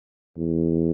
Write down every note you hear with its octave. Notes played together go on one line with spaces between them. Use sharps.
E2